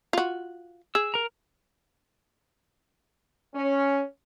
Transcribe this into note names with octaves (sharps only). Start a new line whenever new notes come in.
F4 F#4
G#4 E6
A#4 A#5
C#4